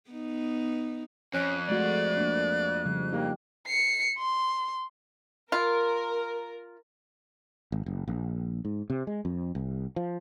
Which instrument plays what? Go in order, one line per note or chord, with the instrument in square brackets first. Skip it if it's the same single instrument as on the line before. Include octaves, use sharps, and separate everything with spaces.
[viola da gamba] B3 D#4
[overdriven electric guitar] F2 [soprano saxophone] C#4 [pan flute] F#6
[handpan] G#3 A3 F#4 [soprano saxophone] D5
[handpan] A#3 D4
C#3 F3 G3
[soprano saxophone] A#3 [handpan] D#4 G4
[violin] C7 C#7
C6
[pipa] F4 [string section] A#4
[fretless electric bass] G#1
F#1
A#1
G#2
C3
G#3
F2
C2
F3